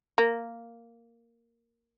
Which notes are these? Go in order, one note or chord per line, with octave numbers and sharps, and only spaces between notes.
A#3